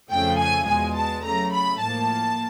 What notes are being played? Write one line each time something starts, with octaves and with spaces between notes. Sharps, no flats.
F2 C#3 F3 A3 G5
G#5
E2 B2 G#3 G#5
A5
C#3 F#3 A3 A#5
B5
A2 F3 A#3 A5